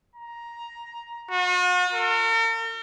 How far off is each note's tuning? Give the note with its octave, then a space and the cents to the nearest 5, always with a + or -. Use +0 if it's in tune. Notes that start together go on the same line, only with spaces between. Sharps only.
A#5 +10
F#4 -45
A#4 -45